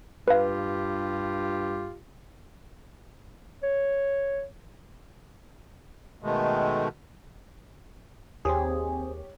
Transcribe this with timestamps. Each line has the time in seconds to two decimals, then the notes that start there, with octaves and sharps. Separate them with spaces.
0.28 G2 F4 G4 B4 F5
3.63 C#5
6.22 B2 D#3 G#3 A3
8.45 D#2 C4 G4 G#4 C#5